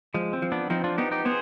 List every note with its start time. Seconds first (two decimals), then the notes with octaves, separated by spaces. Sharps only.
0.14 F3 G#3
0.33 C4
0.42 F3
0.52 B3 D4
0.70 F3 C4 D#4
0.84 D4 F4
0.98 B3 D#4 G4
1.11 D#4 G4
1.25 B3 G#4 C5